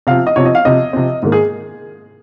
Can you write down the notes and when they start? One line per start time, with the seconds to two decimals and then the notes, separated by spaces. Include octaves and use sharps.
0.07 C3 F3 C4 F5
0.27 D#5
0.36 C3 F3 C4 C#5
0.45 D#5
0.55 F5
0.65 C3 F3 C4 D#5
0.93 C3 F3 C4
1.22 G#2 D#3 A#3
1.32 G#4